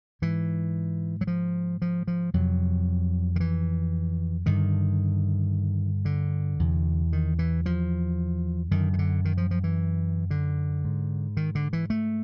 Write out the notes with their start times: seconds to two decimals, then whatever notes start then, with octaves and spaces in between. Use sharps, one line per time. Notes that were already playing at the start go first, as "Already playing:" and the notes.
0.22 G#2 E3
1.21 F#3
1.27 F3
1.82 F3
2.08 F3
2.34 F2 C3 F#3
3.36 D#3
3.40 E3
4.46 G2 D3 D#3
6.05 D3
6.59 E2 C3
7.13 D#3
7.39 E3
7.66 F3
8.71 F#2 D3 D#3
8.93 D#3
8.99 D3
9.25 D#3
9.37 F3
9.51 F3
9.64 E3
10.31 D3
10.84 G#2
11.37 D#3
11.55 D3
11.73 E3
11.90 A3